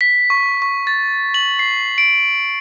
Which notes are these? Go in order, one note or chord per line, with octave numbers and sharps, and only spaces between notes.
B6
C#6
C#6
A6
F#7
C7
D7